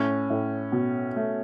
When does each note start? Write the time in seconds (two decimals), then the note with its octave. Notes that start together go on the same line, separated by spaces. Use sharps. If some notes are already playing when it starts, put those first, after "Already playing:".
Already playing: A2 C#4
0.30 A2
0.72 B2
1.16 A3